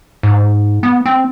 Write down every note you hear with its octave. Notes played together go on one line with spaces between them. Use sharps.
G#2
B3
C4